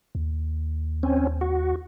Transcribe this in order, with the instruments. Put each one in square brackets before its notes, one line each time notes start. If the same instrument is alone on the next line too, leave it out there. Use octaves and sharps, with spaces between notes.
[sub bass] D#2
[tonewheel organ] C4 C#4
F#4